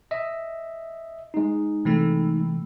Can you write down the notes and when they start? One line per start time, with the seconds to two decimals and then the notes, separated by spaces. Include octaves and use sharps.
0.11 D#5 E5
1.34 G#3 D#4
1.85 C3 E3 A3